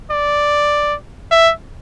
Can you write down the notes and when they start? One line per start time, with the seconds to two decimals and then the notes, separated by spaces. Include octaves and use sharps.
0.11 D5
1.31 E5